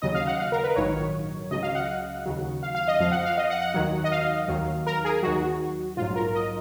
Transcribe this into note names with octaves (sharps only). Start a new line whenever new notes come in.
D#2 C#3 F#3 D#5
F5
F#5
F5
A#4
B4
A#1 G#2 D#3 F#3 C#5
C#2 C#3 F#3 D#5
F5
F#5
D#2 C#3 F#3
F5
F5
D#5
F2 F3 F5
F#5
F5
D#5
F#5
F#5
D#2 D#3 F#3
D#5
F5
D#2 D#3 F#3
A#4
G#4
D#2 D#3 F#3 F#4
A#1 G#2 F#3 F4
A#4
D#5